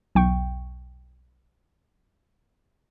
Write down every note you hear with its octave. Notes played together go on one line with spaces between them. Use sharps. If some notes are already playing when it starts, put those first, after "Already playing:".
B1 E2 G5 C#6